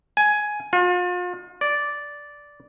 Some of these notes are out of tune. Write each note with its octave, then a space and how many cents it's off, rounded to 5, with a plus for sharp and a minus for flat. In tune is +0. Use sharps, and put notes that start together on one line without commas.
G#5 +10
F4 +40
D5 -10